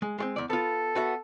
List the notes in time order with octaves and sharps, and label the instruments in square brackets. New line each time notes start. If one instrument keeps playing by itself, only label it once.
[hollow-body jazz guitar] G#3
G#3 A3 C4
E2 D5
[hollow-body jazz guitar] B3 F4 [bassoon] A4
[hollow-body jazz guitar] B3 F#4 E5